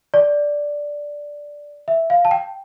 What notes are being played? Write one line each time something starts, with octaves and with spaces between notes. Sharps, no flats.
D5
E5
F5
A5
G5